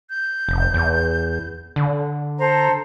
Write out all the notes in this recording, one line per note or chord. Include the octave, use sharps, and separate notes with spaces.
G6
F1
E2
D3
A4 C5 A#5